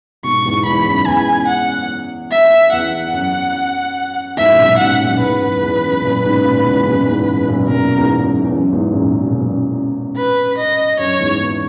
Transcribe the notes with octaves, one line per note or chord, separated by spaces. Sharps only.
G#2 B2 C#6
E2 G#2
E2 G#2 B5
F#2
E2 G#5
F#5
E5
E2 F#5
F#2
E2 G#2 E5
B2
F#2 A#2
G#2 B2 F#5
F#2 A#2
E2 G#2 B4
F#2
E2
F#2
F#2 A#2
G#2 B2
A#2 C#3
E2 G#2
B2
F#2 A#2
E2 G#2
F#2
F#2 A#2
B2
F#2 A#2 A#4
E2 G#2
F#2
E2
F#2
E2 G#2
F#2 A#2
A#2
B2
F#2 A#2
B4
D#5
F#2 C#5
E2 G#2
E2